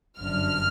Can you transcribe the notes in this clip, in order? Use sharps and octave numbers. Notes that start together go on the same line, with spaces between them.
G1 F#2 D3 F6